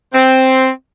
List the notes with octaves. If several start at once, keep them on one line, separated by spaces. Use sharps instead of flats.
C4